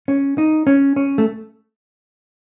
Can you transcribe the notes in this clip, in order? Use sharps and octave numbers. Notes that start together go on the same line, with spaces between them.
C#4
D#4
C#4
C#4
A3